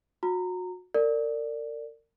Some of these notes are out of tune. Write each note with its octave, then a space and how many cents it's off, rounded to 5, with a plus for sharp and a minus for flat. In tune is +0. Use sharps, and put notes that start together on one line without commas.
F#4 -30 A#5 -20
A#4 -35 D5 +0